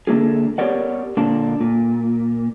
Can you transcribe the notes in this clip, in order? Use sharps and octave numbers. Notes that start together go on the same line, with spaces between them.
D3 A3 A#3 F4 G#4
B3 G4 A#4 C#5 D5 F#5
A#2 D3 A#3 D4
A#2